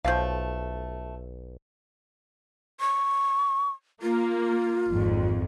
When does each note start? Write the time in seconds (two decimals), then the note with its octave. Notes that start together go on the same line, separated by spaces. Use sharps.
0.05 B1 F3 A3 F5
2.81 C#6
4.02 A#3 F4
4.89 G#1 F2